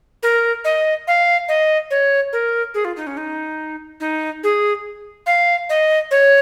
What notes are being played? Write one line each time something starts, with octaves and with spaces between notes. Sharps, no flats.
A#4
D#5
F5
D#5
C#5
A#4
G#4
F4
D#4
C#4
D#4
D#4
G#4
F5
D#5
C#5